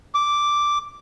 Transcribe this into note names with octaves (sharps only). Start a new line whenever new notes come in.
D6